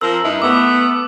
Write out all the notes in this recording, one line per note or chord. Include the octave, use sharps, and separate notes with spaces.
F3 C4 A#4 E6
G2 D#4 E4
A3 B3 D6